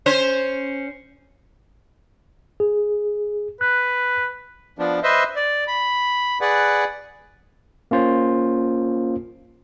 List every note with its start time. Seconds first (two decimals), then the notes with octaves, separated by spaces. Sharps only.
0.06 C#4 C5
2.60 G#4
3.61 B4 F#6
4.79 F3 B3 D4
5.03 B4 C5 D#5 E5
5.36 D5
5.68 B5
6.41 G#4 B4 D5 F#5
7.91 A#3 C#4 F4 C5